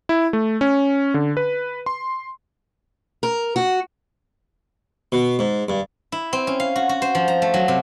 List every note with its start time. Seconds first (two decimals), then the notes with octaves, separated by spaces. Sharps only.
0.09 E4
0.33 A3
0.61 C#4
1.14 D3
1.37 B4
1.86 C6
3.23 A#4
3.56 F#4
5.12 B2
5.39 G#2
5.69 G2
6.12 E4
6.33 C4
6.47 C#4
6.60 F5
6.76 F#4
6.89 F#4
7.02 C5
7.15 F3
7.28 A#5
7.42 A3
7.54 F#3
7.68 C3